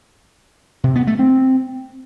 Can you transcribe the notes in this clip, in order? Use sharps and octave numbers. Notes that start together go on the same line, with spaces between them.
C3
B3
A3
C4